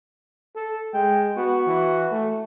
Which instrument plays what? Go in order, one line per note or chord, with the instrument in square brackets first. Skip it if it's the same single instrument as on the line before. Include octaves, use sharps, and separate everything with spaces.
[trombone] A4
[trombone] G#3 [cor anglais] G5
[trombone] B3 [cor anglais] F#4
[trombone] E3
A3